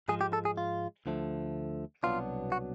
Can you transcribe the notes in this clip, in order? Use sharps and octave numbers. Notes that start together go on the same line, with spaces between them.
G#2 F3 G#3 G#4
G4
A4
G#4
F4
D2 D3 F3 A3
C2 B2 F#3 B3 D4 F4
F#4